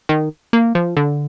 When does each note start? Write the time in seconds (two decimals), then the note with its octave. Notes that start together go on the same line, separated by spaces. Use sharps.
0.09 D#3
0.53 A#3
0.75 F3
0.97 D3